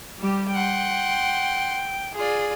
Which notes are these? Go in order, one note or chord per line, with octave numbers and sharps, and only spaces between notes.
G3 G4
F#5 G5 C6
F4 G#4 D5